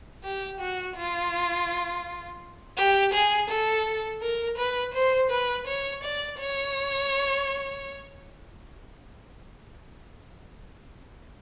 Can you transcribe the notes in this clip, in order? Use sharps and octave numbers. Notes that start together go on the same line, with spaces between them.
G4
F#4
F4
G4
G#4
A4
A#4
B4
C5
B4
C#5
D5
C#5